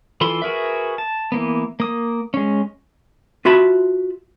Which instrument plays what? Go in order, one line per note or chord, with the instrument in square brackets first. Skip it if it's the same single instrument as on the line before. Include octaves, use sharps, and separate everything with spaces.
[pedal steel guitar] E3 F4 A4 B5 C6
F#4 G#4 A#4 B4 E5
A5
E3 A#3 B3
A#3 D#6
G#3 C#4
[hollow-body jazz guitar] F4 F#4 E5 A5 B5